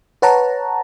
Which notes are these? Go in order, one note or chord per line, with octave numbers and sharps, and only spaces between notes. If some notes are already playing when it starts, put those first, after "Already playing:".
B4 C#5 F#5 A5 A#5